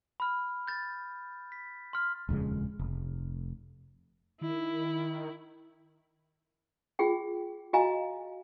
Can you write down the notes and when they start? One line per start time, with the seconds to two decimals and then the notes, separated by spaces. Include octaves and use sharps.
0.20 B5 F6
0.67 G6 A6
1.52 B6
1.93 C6 F6
2.29 D#1 F2 C#3 G#3
2.79 F1
4.41 D#3 E4
6.99 F4 G#4 G5
7.73 F#4 D#5 F5 G#5 A#5